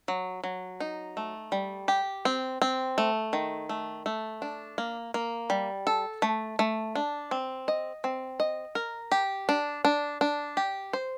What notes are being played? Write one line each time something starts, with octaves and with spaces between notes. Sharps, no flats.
F#3
F#3
D#4
A3
G3
G4
C4
C4
A3
D#3
A3
A3
D4
A#3
A#3
G3
A4
A3
A3
D4
C4
D#5
C4
D#5
A#4
G4
D4
D4
D4
G4
C5